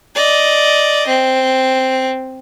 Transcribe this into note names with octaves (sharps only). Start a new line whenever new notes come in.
D5 D#5
C4